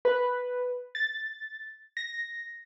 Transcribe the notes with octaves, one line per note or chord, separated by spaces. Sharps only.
B4
A6
A#6